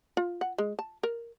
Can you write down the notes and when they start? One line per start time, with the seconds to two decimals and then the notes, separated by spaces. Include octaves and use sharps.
0.17 F4
0.41 F#5
0.58 G#3
0.79 A5
1.03 A#4